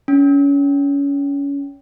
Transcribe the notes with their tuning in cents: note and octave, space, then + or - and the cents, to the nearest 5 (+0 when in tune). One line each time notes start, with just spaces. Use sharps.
C#4 +25